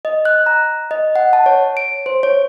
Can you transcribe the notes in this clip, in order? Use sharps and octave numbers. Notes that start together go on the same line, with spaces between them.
D#5
F#6
A#5
D#5
F#5
A5
C#5
D7
C5
C#5